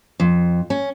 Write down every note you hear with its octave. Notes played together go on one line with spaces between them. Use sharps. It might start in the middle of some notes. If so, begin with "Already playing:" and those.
F2
C#4